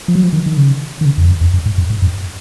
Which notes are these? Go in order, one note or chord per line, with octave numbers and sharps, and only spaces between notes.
F3
F#3
F3
D#3
D#3
C#3
D#3
C#3
F2
F#2
F2
F#2
G#2
F#2
G#2
F#2